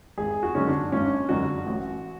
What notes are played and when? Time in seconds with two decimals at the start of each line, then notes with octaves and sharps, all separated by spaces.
0.18 G#1 G#4
0.43 F#4
0.55 F#2 D3 G#3 C#4
0.68 D4
0.92 G#1 C#4
1.29 F#2 D3 G#3 F#4
1.66 A1